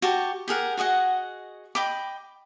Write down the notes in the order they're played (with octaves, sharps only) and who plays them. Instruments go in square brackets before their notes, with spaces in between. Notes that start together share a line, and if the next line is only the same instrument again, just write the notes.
[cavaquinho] F#4 G4 A5
G4 G#4 A#4 F#5
F#4 G#4 D#5 F#5
D#5 G5 B5 D6